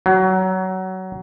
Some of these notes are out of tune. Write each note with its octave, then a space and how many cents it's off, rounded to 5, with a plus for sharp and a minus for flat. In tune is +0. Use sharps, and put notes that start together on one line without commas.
F#3 +20